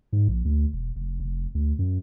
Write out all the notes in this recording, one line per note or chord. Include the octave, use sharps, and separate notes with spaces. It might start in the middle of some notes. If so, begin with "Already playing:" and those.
G#2
A#1
D2
E1
F1
F1
D2
F#2